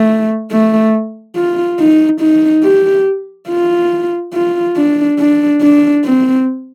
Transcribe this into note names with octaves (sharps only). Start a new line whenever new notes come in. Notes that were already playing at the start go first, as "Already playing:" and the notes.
Already playing: A3
A3
F4
D#4
D#4
G4
F4
F4
D4
D4
D4
C4